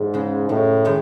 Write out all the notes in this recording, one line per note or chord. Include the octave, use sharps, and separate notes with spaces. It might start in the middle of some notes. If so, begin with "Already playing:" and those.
Already playing: E2 G#2
C#3 G#3
F#2 A2
D#3 G#3 D#4